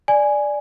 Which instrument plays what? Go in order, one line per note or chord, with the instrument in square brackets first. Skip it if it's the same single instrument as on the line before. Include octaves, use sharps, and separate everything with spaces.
[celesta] D5 G#5